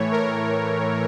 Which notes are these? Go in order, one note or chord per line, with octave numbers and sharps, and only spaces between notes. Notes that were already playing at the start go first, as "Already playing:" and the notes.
Already playing: A2 E3 A3 C#5
A#4